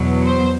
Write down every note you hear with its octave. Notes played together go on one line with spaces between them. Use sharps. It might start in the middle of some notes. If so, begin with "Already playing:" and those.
Already playing: E2 B2 F#3
C5